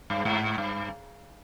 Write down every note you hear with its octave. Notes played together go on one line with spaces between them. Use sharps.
G2
G#2
G2